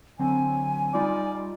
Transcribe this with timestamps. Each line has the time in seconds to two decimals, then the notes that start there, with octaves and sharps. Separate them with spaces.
0.19 D3 F#3 C4 G#5
0.94 G3 D#4 F4 D5